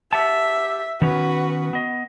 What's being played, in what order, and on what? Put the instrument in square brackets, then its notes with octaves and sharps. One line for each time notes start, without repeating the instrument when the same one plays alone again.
[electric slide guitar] G4 F#5 A5 [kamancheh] E5
[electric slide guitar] D#3 B3 C#4 [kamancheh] F#4 B4
[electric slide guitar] B3 D#5